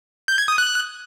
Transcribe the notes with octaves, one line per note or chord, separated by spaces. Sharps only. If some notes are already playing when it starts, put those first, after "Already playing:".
G6
G#6
D#6
F#6